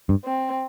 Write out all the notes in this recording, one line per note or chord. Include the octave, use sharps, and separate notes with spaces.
G2
C4